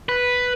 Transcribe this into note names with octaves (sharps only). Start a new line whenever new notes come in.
B4